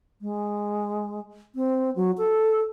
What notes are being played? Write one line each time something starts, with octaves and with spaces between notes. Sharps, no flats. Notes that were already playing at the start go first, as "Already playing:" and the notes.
G#3
C4
F#3
A4